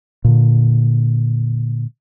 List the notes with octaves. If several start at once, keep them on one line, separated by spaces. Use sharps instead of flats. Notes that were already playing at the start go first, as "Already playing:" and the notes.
A#2 D3